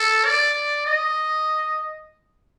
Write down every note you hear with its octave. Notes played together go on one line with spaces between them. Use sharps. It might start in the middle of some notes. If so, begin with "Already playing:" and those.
Already playing: A4
D5
D#5